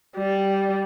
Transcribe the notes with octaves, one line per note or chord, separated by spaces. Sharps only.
G3